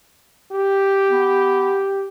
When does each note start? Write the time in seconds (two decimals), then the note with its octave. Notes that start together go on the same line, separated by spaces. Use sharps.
0.52 G4
1.09 B3